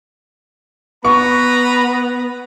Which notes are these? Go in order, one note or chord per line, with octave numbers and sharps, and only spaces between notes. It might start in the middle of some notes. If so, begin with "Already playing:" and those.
B3 B4 A#5 B5 C#6